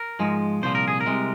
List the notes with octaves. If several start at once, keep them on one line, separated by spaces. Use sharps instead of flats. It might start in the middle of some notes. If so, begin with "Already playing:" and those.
Already playing: A#4
G#2 F3 G#3
C2 A#2 F3 C5
A#4
G#4
A#4
C2 C3 G#3